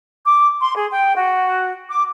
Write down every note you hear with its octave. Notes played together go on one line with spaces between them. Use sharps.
D6
C6
G#4
G5
F#4
D6